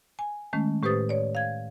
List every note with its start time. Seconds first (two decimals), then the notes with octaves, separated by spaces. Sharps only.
0.19 G#5
0.53 D#3 G#3 A3 C#4
0.83 A2 G4 B4 C5 D#6 A6
1.09 C#5 D5
1.35 F5 G#6